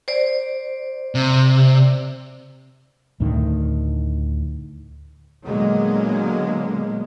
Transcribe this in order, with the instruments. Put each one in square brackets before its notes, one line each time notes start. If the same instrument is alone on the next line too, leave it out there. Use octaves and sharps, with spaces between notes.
[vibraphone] C5 D5
[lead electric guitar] C3
[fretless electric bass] D2 A2 D3 D#3
[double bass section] A#2 D3 F#3 G#3 A#3 B3